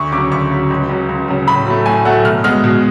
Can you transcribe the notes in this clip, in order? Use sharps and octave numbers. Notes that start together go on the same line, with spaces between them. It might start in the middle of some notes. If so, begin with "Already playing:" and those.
Already playing: D2 C#6
C#3 F#3 D6
D2 C#6
C#3 F#3
C#2
C#3 F#3
C#2
C#3 F#3
A2 B5
F#3 A3
A2 G#5
F#3 A3 F#5
B2 F6
G#3 B3 F6
B2